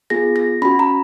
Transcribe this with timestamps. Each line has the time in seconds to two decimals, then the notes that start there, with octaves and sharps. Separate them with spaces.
0.10 B3 F4 G#4 A#6
0.36 A#6
0.62 C#4 F#4 B5
0.79 A#5